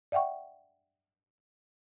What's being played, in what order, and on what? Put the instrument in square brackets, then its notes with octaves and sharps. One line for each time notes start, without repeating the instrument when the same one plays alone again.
[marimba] D5 E5 F#5 G5 C#6